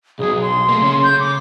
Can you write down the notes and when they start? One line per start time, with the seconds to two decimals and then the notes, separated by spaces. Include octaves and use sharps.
0.19 B1 F#3 G#4
0.42 C6
0.69 A3 A#3
0.82 C#3 C#4
1.04 G6
1.19 D6